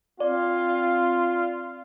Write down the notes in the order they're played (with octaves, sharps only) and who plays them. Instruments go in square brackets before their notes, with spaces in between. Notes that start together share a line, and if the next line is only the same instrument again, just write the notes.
[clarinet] C4 [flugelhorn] F4 [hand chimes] D5